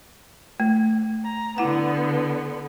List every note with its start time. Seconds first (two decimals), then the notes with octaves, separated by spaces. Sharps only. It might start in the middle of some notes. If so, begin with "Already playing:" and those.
0.60 A3
1.25 A#5
1.58 D3 B3 E4 F#5